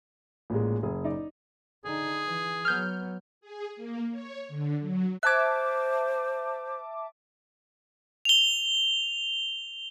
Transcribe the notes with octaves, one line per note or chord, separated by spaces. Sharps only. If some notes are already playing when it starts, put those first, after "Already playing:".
A1 A#2 G#3
F#1 G#4
D#4 D5
D3 D#4 G#4
E3
F#3 B3 F6 G6
G#4
A#3
C#5
D3
F#3
C5 E5 A5 D6 F#6 G#6
F7 G7